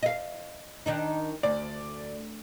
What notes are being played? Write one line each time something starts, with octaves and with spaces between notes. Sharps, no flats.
D#5 F5
D#3 D4 D#4
D2 D5